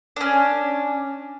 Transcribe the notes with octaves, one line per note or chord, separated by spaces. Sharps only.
C#4 D4